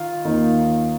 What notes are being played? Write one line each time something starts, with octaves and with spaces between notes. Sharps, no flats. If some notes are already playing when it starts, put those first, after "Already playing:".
Already playing: D#3 F4
D#2 D#3